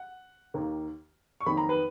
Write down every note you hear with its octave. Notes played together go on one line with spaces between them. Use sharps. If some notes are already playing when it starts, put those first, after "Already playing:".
Already playing: F#5
D#2 D#3 A#3
C#6
F2 D#3 F#3 A#3 B5
A#5
B4